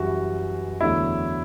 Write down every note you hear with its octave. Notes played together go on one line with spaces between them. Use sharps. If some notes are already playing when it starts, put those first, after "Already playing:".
Already playing: F#2 E3 G3 F#4
E2 D3 F#3 A3 E4